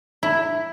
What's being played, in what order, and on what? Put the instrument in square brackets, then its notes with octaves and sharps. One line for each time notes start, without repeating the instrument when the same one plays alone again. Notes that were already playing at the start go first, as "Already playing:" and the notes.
[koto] E4